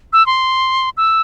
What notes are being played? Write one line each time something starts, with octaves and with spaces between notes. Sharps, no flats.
E6
C6
E6